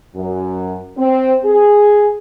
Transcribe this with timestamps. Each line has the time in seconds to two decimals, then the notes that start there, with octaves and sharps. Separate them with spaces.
0.16 F#2
0.98 C4
1.45 G#4